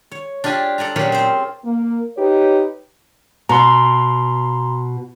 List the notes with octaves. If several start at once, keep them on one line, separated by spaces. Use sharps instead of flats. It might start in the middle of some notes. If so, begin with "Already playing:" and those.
C#5
D4 F4 G4 G#5 A5
A4 D5 G#5 A#5
A#2 F#3 C#4 F4 G4 G#4
C4 C5
A#3
D#4 G4 B4 C#5
B2 A#5 C6